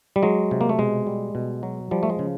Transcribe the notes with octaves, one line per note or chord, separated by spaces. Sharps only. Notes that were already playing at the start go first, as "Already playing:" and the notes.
G3
F#3 G#3
C3
A#3
A3
B2 G#3
G3
B2
F#3
F3 G3
A3
G#3
C#3